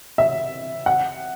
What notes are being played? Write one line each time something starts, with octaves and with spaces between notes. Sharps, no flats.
E5
F#5